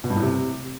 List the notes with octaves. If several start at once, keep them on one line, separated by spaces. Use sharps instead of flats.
B2
G2
A2
C3